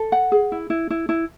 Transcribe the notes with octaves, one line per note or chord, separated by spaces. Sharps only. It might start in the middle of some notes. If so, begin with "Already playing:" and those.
Already playing: A4
F#5
G#4
E4
E4
E4
E4